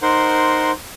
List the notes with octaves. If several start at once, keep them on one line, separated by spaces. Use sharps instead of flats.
D#4 A#4 C5 F#5 C6